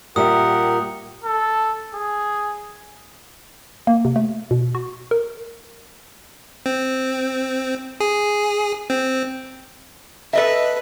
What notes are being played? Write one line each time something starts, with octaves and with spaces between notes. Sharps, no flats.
A#2 G3 G4 A#4 E5 F#5 D#6
A4
G#4
A#3
C3
A3
B2
F#4
A#4
C4
G#4
C4
A4 B4 D#5 E5